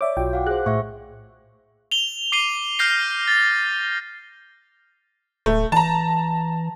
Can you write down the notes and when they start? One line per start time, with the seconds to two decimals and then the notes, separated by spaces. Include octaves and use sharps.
0.01 C#5 D5 E5 D6
0.17 B1 F4 F#4 G5
0.33 F5 F#5 D6
0.47 G#4 C5 F#6
0.66 A2 E5 C#6
1.91 F7 G7
2.32 D6 C7 D#7 G7
2.79 F6 G6 A#6 C7
3.28 A6
5.46 D1 A3
5.72 E3 A5 A#5